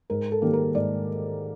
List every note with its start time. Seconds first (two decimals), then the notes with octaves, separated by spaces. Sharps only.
0.10 G#2 A#4
0.32 A4
0.42 D#3 G3 A#3
0.53 A#4
0.75 G#2 D5